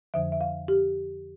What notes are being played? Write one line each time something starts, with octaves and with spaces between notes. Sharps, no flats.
F2 D3 F3 E5
E5
F5
G4